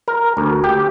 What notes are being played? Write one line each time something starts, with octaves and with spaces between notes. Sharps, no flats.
A#4
D2
G4